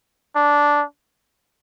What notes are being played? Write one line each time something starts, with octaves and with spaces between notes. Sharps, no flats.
D4